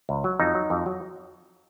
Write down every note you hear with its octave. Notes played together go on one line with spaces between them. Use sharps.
C#2
F#3
F2 D#4
F#3
F2
F#3